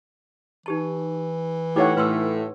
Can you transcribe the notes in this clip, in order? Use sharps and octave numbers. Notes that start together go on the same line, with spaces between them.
E3 D#4 G4 A5
A2 D#4 E4 G4 C#5 F#5 D6
A2 B4 C6 E6